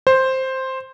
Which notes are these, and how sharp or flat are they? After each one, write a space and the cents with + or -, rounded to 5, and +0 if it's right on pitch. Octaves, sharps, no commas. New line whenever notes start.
C5 +5